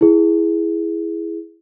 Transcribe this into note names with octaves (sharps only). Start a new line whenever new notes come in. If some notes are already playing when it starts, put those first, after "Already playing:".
E4 G#4